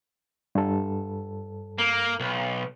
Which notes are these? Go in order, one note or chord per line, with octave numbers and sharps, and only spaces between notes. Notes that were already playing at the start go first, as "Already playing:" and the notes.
G2 A4
A#3
B1